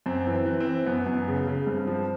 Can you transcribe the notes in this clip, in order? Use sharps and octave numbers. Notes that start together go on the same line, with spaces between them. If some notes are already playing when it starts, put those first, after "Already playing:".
F#2 C4
E3
C4
E3
C4
E3
F#2 B3
F#2
C#3
C#3
G2 C4
F3